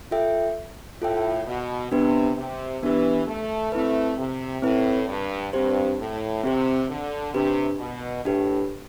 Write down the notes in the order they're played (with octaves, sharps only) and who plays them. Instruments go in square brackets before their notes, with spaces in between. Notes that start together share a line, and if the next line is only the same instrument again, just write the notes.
[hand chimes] F4 A4 E5 G5
[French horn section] A2 [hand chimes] F4 A4 E5 G5
[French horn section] B2
[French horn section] C3 [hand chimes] B3 D4 G4 B4
[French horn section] C3
[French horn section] E3 [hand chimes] B3 D4 G4 B4
[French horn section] A3
[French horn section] A3 [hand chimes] C4 E4 B4
[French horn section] C3
[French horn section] A2 [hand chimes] C4 E4 B4
[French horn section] G2
[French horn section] G2 [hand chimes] C4 G4 C5
[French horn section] A2
[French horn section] C3 [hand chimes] C4 G4 C5
[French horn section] D3
[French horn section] C3 [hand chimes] D4 G4 B4
[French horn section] B2
[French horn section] A2 [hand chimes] D4 G4 B4